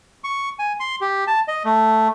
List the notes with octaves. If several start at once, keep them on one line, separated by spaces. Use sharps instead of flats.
C#6
G#5
C6
G4
A5
D#5
A3